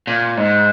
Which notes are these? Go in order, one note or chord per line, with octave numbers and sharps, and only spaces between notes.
A#2
G#2